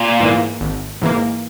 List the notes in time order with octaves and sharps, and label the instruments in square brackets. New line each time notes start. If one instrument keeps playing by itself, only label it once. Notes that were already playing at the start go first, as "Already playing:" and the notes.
Already playing: [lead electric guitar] A#2
[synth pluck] G#2 E3 A#3
G#1
G#2 E3 A#3